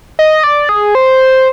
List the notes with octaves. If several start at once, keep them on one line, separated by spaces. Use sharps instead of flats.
D#5
D5
G#4
C5